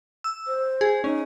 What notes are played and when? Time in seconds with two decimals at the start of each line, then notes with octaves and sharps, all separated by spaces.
0.24 E6
0.47 C5
0.81 G#4
1.04 C#4 D#4